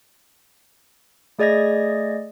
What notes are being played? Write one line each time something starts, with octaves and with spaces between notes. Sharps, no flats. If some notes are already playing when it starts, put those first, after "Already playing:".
A3 G#4 D5 D#5 G#6 A#6